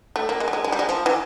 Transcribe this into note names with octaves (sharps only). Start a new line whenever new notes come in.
A3
A#3
G#3
A3
G#3
G#3
G3
G#3
F3
E3